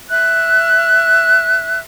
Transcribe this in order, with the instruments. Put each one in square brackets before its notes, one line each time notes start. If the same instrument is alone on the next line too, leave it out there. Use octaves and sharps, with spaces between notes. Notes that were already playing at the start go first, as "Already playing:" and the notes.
[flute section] E5 F#6